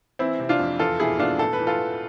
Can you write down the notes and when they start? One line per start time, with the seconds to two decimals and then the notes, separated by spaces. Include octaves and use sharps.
0.19 E3 C4 E4
0.40 C3
0.49 D4 F4
0.60 F2
0.79 E2 F4 A4
1.00 B2 E4 G#4
1.19 B2 D4 F4
1.39 A2 A4
1.53 B4
1.60 E3
1.67 F4 A4
1.79 E3